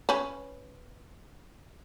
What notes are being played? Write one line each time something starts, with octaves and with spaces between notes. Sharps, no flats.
C#4 B4